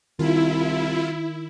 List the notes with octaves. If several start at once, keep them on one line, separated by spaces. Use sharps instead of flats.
C2 D#3 E4 F4